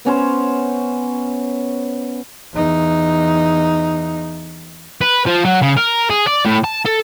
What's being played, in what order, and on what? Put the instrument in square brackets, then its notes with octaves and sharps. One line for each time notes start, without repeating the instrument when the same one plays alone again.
[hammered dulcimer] B3 C#4 C5
[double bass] E2 D#4
[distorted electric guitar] B4
F3
F#3
C#3
A#4
G#4
D5
A2
A5
A4